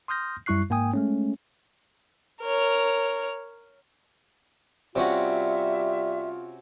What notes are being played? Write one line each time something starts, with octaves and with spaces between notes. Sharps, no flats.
C6 D#6 F6 G6 A#6
F#2 G3 E4 C#6 F#6 C7
G#2 A#3 G5 G#5 D#6
G#3 A3 C#4
A#4 C#5
C3 G3 C#4 F4 F#4 E5